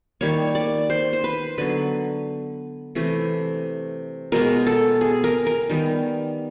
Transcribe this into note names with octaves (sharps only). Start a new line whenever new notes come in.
D#3 G3 A#3 C#5
D5
C5
C5
B4
D3 F#3 B3 B4
C3 E3 A3
B2 G#3 B3 A#4
A4
G#4
A#4
A#4
D#3 G3 B3